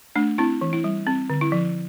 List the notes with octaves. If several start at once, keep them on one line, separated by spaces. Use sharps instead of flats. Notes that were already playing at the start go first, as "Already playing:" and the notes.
A3 D4
C4 E4
E3
E4
G3
C4
D3
E4
F3